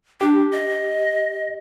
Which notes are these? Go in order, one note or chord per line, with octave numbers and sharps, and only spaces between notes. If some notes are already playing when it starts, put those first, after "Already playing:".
D4 G4
D#5